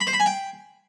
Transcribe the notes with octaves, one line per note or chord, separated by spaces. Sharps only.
B5
C5
B5
G#5
G5